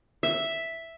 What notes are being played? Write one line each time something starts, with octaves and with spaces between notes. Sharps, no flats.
E5